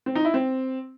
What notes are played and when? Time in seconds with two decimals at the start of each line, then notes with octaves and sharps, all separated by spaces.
0.06 C4
0.15 D#4
0.25 E4
0.34 C4